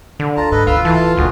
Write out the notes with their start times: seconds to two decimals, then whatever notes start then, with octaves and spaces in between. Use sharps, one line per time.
0.20 D3
0.37 D2 F4 A5 A#5
0.51 G#2 A4 B4 D#5
0.67 D1 D2 F4 B4 E6
0.85 E3 A4 A5
1.17 G1 D2 A#2 F#4 G#4